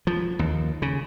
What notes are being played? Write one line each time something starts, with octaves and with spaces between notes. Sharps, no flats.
F3
D#2
C#3